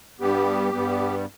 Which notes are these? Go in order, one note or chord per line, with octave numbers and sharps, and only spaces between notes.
G2 G3 B3 G4
G2 G3 B3